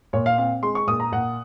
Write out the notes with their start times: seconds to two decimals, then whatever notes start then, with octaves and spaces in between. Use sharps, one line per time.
0.13 A#2 C#5
0.26 F5
0.38 C4 F5
0.63 G#3 C6
0.75 C#6
0.87 A#2 D#6
1.00 A#5
1.12 A#2 F#5